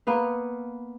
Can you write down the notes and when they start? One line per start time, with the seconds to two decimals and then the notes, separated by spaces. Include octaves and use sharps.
0.07 A#3 B3 B4 F5